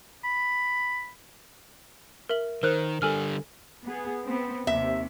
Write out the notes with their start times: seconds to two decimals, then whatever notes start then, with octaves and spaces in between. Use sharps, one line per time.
0.24 B5
2.29 A#4 E5 F#7
2.63 D#3 A#4 C5 F#6
3.02 D3 G3 A4 G#5 F6
3.84 B3 G#4
4.23 B3 C4
4.67 D#2 C3 E5